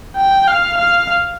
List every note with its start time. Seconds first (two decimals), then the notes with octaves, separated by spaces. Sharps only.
0.16 G5
0.48 F5
0.78 F5